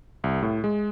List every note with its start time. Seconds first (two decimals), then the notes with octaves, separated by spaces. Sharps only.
0.24 C2
0.42 A2
0.64 G#3